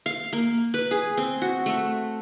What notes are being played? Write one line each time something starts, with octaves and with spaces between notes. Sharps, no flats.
F5
A#3
B4
G#4
C4
F#4
A3